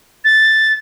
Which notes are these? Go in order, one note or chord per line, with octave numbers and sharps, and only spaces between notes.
A6